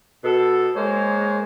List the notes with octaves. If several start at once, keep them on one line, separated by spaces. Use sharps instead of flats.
B2 A4
G#3 A#3 C5 C#5